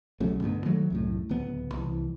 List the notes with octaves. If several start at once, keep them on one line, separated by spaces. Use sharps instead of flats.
B1 C#3 F#3 A3
D2 G2 B3
D#3 F#3 A3
C2 F#2 A2
D1 C#2 B3
C2 E3